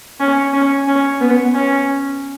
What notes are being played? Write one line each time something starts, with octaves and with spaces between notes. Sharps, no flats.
C#4
C#4
C#4
B3
C#4